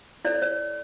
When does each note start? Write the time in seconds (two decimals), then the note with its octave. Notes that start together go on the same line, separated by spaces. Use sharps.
0.25 E4 A4 C#5 D5
0.42 C#5